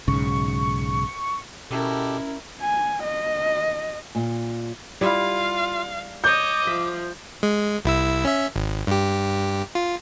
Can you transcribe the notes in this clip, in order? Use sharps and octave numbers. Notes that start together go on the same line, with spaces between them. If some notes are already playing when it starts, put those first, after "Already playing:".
B1 G#2 C#3 C#6
B2 C#4 E4 G4 A4 A#4
G#5
D#5
A#2
G3 E4 F4 F5
C#5 D#5 D6 G6
F3 E5
G#3
C2 E4 E6
C#4 E5
G#1
G2 G4
F4